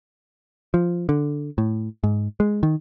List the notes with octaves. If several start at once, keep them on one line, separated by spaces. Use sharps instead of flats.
F3
D3
A2
G#2
G#3
D#3